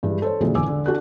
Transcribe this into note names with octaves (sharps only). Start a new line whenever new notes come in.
G2 E3 G#3
A4 C5 C#5
F2 A#2 D3 E3 F#3 G#3
E1 A1 D3 G#5 D6 E6
D3
D4 F#4 A4 F#6